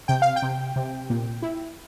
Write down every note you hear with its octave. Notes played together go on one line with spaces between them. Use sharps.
C3 G5
F5
G5
C3
C3
A#2
E4